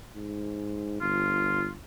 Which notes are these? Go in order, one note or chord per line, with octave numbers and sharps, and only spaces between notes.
G#2
G1 F4